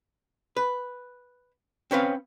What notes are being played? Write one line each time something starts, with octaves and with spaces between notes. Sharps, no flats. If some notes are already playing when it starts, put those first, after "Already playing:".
B4
C4 C#4 B4 F5